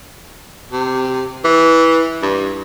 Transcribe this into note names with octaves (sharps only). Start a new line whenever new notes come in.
C3
E3
G2